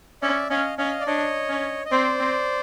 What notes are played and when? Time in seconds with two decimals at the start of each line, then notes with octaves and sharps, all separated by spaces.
0.22 C#4 D5 E5
0.50 C#4 D#5 F5
0.78 C#4 D#5 F5
1.00 D5
1.07 D4 C#5 D#5
1.49 C#4
1.85 D#5
1.91 C4 C5 D5
2.20 C4